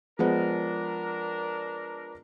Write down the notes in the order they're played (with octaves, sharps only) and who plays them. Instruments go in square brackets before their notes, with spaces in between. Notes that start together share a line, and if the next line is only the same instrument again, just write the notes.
[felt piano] F3 G#3 B3 [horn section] D4 A#4